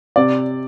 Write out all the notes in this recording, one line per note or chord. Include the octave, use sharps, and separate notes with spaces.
C3 D5